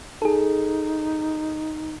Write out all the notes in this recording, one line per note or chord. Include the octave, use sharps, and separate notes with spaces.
D#4 G#4 A4